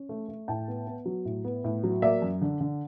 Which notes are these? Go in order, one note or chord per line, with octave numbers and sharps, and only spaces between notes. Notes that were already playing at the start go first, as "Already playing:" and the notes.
Already playing: C#4
A3
A3
A2 G5 A5
B3
B3
F#3
A2
B3
A2
F#3
A#3 D5 E5
F#2
D3
D3